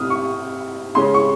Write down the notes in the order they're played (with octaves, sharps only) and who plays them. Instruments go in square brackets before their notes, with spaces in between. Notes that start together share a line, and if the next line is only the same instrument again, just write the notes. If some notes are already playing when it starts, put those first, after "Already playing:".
Already playing: [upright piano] C3 D#6 F6
C#6
C#3 G#3 C#4 C6
C#6